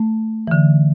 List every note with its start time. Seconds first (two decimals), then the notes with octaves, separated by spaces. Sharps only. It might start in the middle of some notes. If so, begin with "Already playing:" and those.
Already playing: A3
0.47 E3
0.51 D3